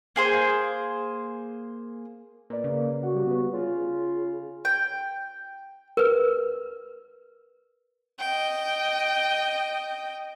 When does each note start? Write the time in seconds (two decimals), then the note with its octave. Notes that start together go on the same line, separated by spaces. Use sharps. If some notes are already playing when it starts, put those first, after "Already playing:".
0.16 A#3 G#4 C5
2.50 A#2 A#4 B4 D5
2.64 C#3 A#3
3.03 F#4 F#5
3.15 G3 G4
3.27 B3 B4
3.52 C#3 F4
4.65 G5
5.97 A#4 B4
8.20 D#5 G5